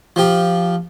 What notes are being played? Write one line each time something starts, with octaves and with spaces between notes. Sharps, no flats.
F3 G4